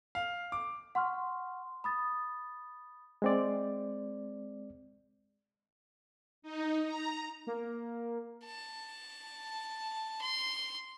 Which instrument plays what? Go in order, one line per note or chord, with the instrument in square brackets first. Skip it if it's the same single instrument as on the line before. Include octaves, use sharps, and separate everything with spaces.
[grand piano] F5
D6
[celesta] F#5 C6 C#6 F6
B5 D#6 A6
[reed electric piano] G#3 C4 D5
[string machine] D#4
A#5
[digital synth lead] A#3
[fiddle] A5
C6